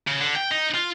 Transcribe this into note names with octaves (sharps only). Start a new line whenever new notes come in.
C#3
D3
G5
D#4
F4